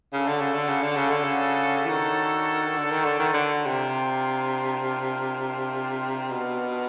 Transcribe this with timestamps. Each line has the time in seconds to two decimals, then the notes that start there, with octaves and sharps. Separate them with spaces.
0.13 C#3 D4 F#4 A4 C#5
0.28 D3
0.40 C#3
0.54 D3
0.69 C#3
0.83 D3
0.96 C#3
1.10 D3
1.24 C#3
1.85 E3
1.89 D#3
2.78 D3
2.91 D#3
3.05 D3
3.19 D#3
3.34 D3
3.65 C3 D4 F4 A#4
6.31 B2